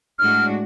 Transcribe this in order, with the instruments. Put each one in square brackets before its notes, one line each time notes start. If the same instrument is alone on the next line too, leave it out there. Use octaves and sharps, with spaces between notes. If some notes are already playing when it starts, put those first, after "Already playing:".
[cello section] A2 G#3 D4 F#4 [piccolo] F6